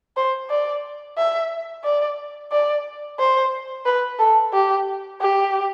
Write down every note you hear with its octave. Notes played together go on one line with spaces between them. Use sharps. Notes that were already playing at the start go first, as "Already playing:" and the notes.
C5
D5
E5
D5
D5
C5
B4
A4
G4
G4